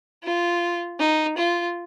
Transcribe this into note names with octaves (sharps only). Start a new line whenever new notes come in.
F4
D#4
F4